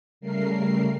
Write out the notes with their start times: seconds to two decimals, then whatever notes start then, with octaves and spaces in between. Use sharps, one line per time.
0.21 C#3 G3 A3 A#4 C7